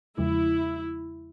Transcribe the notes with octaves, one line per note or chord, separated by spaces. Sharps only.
E2 C#3 F3 G#3 E4